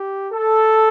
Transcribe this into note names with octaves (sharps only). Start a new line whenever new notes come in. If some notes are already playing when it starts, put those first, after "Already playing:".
Already playing: G4
A4